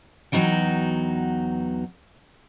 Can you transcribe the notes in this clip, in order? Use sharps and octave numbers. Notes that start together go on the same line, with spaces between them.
E2 E3 F#3 D#4 F#4 G5